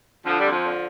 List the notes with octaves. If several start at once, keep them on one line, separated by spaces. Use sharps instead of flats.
D3 F3
G3
F2
F3
D3